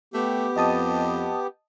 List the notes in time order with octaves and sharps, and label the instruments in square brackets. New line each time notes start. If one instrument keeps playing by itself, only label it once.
[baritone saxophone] A3 [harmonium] B3 G4
[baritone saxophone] F2 [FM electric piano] D#5 A5 D#6